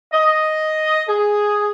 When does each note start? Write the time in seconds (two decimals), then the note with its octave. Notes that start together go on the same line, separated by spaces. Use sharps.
0.13 D#5
1.08 G#4